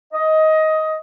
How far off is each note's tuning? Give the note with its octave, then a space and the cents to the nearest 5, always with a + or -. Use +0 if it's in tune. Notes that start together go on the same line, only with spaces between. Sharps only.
D#5 +15